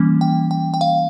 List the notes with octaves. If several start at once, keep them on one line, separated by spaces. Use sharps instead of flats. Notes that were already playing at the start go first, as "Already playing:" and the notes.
Already playing: E3 G3 A#3 C#4
G5
G5
G5
F5